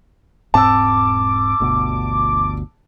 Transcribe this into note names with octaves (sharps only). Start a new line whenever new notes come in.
E1 G#2 C4 A5 D6 E6
G1 D2 B2